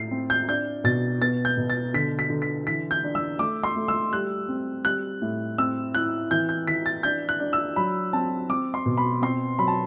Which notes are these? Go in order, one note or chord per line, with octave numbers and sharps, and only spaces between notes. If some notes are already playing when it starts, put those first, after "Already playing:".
Already playing: A2 C7
C4
G6
D4 G6
B2 A6
B3 A6
G6
B2
A6
D3 B6
B6
D3
B6
E3 B6
G6
D4
E6
A3 D6
C6
A3
E6
G3 F#6
C4
G3 F#6
A2
C4 E6
E4 F#6
E3 G6
G6
E3 B6
A6
D4 G6
F#6
D4
E6
F#3 B5
C4 A5
C4 D6
C6
B2
B5
C4 C6
F#3 B5
A5